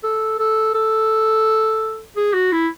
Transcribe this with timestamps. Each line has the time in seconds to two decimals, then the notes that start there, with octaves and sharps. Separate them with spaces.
0.04 A4
0.39 A4
0.74 A4
2.17 G#4
2.34 F#4
2.52 E4